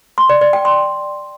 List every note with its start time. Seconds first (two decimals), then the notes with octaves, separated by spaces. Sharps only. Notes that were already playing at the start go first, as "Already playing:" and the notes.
0.18 C6
0.30 D5
0.41 D5
0.53 G5
0.65 C6